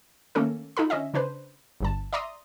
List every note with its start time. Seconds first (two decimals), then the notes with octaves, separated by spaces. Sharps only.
0.35 D#3 A3 A#3 C#4 A4 A#4
0.77 D#4 F4 A4 B5
0.90 D3 C#4 D#5 E5
1.14 C#3 D4 B4 C5
1.80 G1 G2 A5
2.13 D5 E5 A#5 C6 D#6